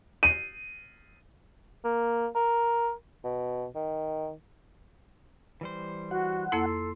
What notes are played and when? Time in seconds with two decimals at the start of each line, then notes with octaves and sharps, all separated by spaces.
0.23 D#7
1.84 A#3
2.35 A#4
3.24 B2
3.75 D#3
5.61 E3 G3 C5
6.11 F#4 F#5
6.52 F2 A#3 E4 A4 C6